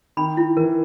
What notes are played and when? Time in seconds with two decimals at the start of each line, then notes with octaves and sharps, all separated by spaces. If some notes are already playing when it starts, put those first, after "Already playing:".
0.17 D#3 B5
0.37 E4
0.57 E3 A#4